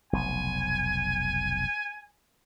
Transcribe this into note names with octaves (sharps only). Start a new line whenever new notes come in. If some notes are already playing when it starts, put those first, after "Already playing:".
F1 B1 G#5